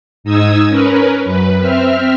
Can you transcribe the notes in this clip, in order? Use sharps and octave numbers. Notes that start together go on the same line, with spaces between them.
G#2 D#4 D#6 E6 G#6
C#4 A#4 B4
F#2 B4
C4 E5 F6